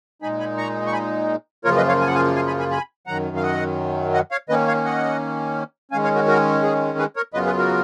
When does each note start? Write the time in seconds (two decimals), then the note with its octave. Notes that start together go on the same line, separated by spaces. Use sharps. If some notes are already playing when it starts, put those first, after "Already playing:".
0.22 A#2 G#3 D#4 G#5 B5
0.40 G#5 B5
0.58 A#5 C#6
0.87 C#6
0.93 G#5 B5
1.65 F#2 C#3 F3 A#3 F4 A#4 C#5
1.77 B4 D#5
1.88 C#5 F5
2.01 G#5
2.07 F#5
2.15 F5 G#5
2.36 F5 G#5
2.47 G#5 B5
2.59 G#5 B5
2.71 G#5 B5
3.07 F#2 D#3 F#3 F#5 A#5
3.36 F5
3.42 D#5 F#5
4.14 D#5 F#5
4.31 C#5 F5
4.49 D#3 A#3 C#4 B4 D#5
4.68 C#5 F5
4.85 D#5 F#5
5.91 D#3 G#3 C#4 F5 G#5
6.04 C#5 F5
6.15 F#4 A#4
6.27 F#4 A#4
6.63 G#4
6.99 G#4 B4
7.16 A#4 C#5
7.34 F#2 C#3 F#3 B3 F4 B4 D#5
7.46 G#4 B4
7.58 F#4 A#4